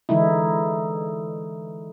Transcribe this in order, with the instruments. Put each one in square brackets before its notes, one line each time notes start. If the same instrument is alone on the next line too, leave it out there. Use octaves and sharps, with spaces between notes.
[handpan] D3 E3 G#3 D#4 E4